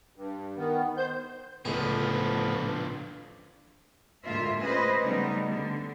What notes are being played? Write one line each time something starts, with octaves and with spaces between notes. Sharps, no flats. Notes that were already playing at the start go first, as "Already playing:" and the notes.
G2
D#3 B3
C5 G6
C#2 A2 D3 F3 B3 G#4
D2 A2 G#3 A#3 F4 E5
C#4 G#4 B4 C5 D#5
C#3 G3 A3 B3 D#4
D3